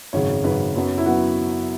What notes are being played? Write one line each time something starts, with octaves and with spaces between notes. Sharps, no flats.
G#1 F#2 C#3 C#5
G#1 F#2 C#3 B4
F#2 F#3 B3
E4
F#3 B3 F#4